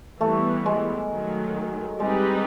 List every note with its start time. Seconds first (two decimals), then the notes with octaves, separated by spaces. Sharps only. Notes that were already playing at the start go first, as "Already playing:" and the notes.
0.20 E3 G3 A3 B3
0.66 G#3
1.10 D#3 F#3 A3
2.00 G3 G#3 C4 D#4 G4 B4